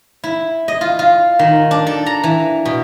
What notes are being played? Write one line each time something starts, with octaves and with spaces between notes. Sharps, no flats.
E4
D#5
F4
F4
D#3
D4
A4
A#5
E3
B2